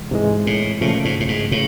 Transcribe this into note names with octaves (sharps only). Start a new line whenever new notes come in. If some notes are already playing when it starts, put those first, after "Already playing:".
Already playing: C3 E3 G#3
G#2 C3 E3 G#3
A2
A#2 C#3 F3 A3 C#4
G#2
A2
G#2
A2 C#3